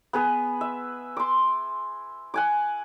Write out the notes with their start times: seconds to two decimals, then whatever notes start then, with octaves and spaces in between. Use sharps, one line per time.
0.13 B3 G#4 B4
0.61 E5
1.17 C6 D6
2.34 F#5 G#5 D6